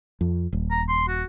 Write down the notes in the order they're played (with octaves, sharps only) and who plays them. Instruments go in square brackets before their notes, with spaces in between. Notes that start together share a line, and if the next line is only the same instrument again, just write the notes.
[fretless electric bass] F2
D#1
[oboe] A#5
C6
F#4